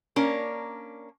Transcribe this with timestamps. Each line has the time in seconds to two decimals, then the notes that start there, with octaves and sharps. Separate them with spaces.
0.16 A#3 C#4 D4 A#4